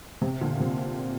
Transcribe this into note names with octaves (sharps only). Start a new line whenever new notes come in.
C3
A#2 D3
C3